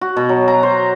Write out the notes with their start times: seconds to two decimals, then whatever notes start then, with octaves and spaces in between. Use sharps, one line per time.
0.01 F#4
0.17 B2
0.29 F#3
0.48 A#5
0.63 C5